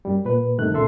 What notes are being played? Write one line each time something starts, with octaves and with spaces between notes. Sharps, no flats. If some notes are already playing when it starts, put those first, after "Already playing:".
F#2 G3
A#2 B4
G2 C3 D#3 A3 F#6
C#2 A#2 C#3 A4 E5 C6